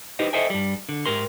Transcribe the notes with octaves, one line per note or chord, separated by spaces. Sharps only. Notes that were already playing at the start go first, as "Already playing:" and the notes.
D#4 G4 B4 C5 D#5
A4 C5 D#5 E5 G5 G#5
G2 G3
D3
G#2 G4 A#4 C6